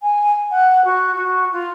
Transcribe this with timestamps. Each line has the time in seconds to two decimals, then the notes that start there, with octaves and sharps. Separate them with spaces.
0.01 G#5
0.50 F#5
0.84 F#4
1.15 F#4
1.52 F4